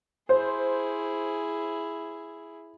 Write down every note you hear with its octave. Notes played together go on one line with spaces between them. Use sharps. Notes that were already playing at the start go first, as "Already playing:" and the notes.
E4 G#4 C5